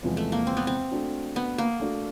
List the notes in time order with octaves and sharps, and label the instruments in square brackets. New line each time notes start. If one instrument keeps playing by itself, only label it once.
[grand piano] E2 C3 F3 G#3
[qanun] A3
A#3
C4
B3
C4
[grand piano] A3 D4 F#4
[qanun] B3
A#3
[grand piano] A3 D4 F#4